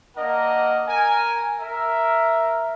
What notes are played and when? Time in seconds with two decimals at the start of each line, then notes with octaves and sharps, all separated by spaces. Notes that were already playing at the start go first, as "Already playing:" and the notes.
0.17 A#3 D4 A#4 D#5 F#5
0.88 A#4 G#5
1.60 A#4 E5